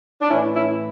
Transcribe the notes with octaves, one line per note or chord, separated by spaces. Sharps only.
D4
A2 E3 C#4 E4
C#4 E4